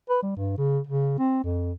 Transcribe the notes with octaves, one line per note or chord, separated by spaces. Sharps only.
B4
G3
G2
C#3
C#3
C4
F2